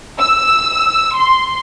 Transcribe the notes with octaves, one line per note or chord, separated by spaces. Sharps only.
E6
C6